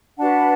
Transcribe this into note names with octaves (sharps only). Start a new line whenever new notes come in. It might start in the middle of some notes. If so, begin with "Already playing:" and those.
D4 F#4 B4 F#5 A5